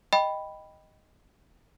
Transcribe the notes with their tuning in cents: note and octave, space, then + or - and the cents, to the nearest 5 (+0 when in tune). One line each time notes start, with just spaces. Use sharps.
D#5 +0 G5 +0 B5 +0